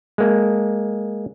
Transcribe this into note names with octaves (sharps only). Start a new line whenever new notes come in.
G#3 A#3